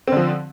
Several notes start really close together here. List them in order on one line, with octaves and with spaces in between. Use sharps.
C4 D3 F3